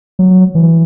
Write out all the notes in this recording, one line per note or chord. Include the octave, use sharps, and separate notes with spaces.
F#3
E3